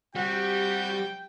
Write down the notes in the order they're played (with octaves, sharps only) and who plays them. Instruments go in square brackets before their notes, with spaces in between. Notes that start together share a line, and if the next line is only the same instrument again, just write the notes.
[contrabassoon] C3 [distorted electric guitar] G3 [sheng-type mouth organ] F#4 [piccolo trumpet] G5